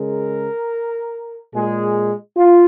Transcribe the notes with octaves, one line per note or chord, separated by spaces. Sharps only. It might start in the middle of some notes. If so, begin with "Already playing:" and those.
Already playing: C#3 G#3 A#4
A#2 G#3 G#4
F4